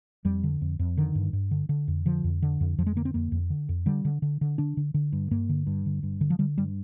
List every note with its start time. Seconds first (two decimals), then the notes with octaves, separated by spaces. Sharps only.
0.25 F2 G3
0.44 D3
0.61 F2
0.79 F2
0.97 D3 D#3
1.15 G2
1.33 G2
1.51 D3
1.69 D3
1.88 F2
2.06 D3 F3
2.24 F2
2.42 D3
2.61 F2
2.78 F2 F3
2.86 G#3
2.96 D3 A#3
3.05 C4
3.14 F2 A#3
3.32 F2
3.50 D3
3.69 F2
3.86 D3 G3
4.05 D3
4.22 D3
4.41 D3
4.58 D3 D4
4.77 D3
4.94 D3
5.12 G2
5.31 G2 A#3
5.49 D3
5.67 G2
5.86 D3
6.03 G2
6.21 D3
6.30 F3
6.39 D3 G3
6.58 G2 G3